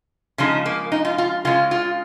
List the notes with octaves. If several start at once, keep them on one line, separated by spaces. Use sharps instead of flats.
C#3 F3 G#3 D#4
A#3
D#4
F4
F4
C#3 G#3 F4
F4